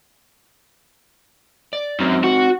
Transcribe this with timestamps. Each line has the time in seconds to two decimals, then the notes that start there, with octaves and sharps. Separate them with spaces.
1.73 D5
2.00 F#2 C4 D#4
2.24 F#4